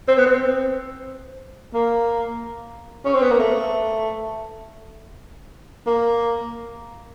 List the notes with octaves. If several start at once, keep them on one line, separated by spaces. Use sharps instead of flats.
C4
B3
C4
A#3
C#4
C4
B3
A#3
A3
A#3